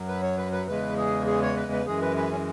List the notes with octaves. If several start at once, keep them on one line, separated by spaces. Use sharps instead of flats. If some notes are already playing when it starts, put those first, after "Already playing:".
Already playing: F#2 F#3
B4
C#5
B4
B4
E2 C#3 E3 G#3 B4
G#4
G#4
C#5
B4
B4
F#2 E3 G#3 G#4
B4
B4
C#4